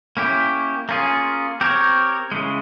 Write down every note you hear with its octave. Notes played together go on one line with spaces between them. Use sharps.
A#3 C#4 E4 G4
A#3 C#4 F4 G#4
C4 G4 A#4 C#5
C#3 E3 G#3